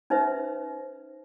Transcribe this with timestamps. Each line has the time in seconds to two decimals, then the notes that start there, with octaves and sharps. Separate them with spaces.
0.10 C#4 D#4 B4 C5 E5